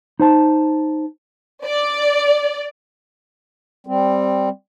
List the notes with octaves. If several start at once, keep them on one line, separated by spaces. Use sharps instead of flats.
D#4 C5 A5
D5
G3 C4